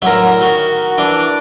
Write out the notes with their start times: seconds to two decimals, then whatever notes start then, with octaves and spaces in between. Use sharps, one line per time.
0.02 A2 D3 F#3 A#4 E5
0.41 D#3 F#4
0.98 E3 D4 D6